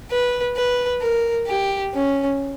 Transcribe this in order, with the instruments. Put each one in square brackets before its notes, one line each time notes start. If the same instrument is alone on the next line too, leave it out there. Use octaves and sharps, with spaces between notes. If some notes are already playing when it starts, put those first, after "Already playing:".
[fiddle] B4
B4
A#4
G4
C#4